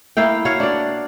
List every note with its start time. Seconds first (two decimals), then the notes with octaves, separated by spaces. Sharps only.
0.17 A#3 E4 F5 G5
0.45 F#4 C#5 F5 F#5
0.60 D4 D5